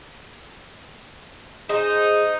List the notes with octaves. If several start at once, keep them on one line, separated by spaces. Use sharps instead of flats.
D#4 G#4 C5 D#5